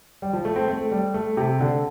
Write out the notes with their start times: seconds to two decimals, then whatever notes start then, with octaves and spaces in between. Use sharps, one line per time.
0.22 G3
0.33 F3
0.45 A3
0.56 C4
0.68 A3
0.92 G3
1.14 A3
1.37 C3
1.60 D3